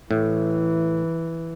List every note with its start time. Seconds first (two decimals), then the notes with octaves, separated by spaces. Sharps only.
0.11 A2 E3